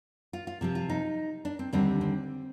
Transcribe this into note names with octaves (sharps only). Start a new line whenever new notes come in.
F4
F4
C3 F3 C4
F4
D#4
D4
C4
D#2 D3 G3 C4 D4
C4